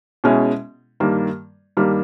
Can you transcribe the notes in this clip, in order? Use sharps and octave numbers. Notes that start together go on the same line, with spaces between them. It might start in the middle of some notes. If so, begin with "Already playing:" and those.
B2 G#3 C#4 E4
G2 D#3 G3 A#3
G2 D#3 G3 A#3